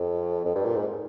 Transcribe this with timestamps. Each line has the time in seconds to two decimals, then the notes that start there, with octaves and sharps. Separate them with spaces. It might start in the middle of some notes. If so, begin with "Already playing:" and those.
Already playing: F2
0.45 F2
0.55 G2
0.65 A#2
0.76 G#2